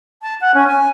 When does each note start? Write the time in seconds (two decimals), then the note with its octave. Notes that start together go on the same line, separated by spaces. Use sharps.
0.22 A5
0.41 F#5
0.54 C#4
0.67 G#5